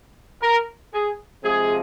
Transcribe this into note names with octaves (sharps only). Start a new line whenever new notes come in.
A#4
G#4
C3 F3 G#3 G#4